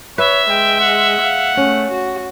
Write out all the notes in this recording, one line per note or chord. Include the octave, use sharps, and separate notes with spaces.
B4 C#5 E5
G#3 G5
F#5
F5
A3 C#4
F#4